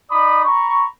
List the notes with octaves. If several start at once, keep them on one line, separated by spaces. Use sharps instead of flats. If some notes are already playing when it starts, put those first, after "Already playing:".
D#4 D5 B5 D#6
A#5 B5 C#6